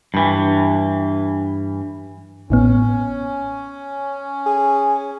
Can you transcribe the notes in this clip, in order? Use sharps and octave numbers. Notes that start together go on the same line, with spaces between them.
G2 E3
A1 A2 B3 C#4
G#4